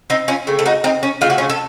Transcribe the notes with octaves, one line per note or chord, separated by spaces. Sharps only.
C4 D#4
C#4 F4
C#3 A3 C4
A4
D#4 F#4
C4 D#4
C#4
C#3 A3 C4 F4
F#4
C#4 F4
A4